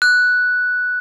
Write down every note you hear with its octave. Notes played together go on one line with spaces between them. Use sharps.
F#6